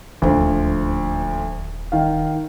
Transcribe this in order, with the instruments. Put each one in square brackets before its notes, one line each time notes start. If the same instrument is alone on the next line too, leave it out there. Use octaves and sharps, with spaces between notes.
[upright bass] D#1 D#4 [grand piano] D2 F3
[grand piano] D#3 F5